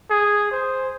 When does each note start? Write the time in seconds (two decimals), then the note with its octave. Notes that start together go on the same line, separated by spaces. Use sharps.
0.10 G#4
0.52 C5